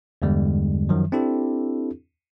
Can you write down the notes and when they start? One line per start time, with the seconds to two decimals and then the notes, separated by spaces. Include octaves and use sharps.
0.22 E2 G2 D3 G3 G#3
0.89 F#2 D#3 F3 F#3
1.12 C4 D4 E4 G4 A4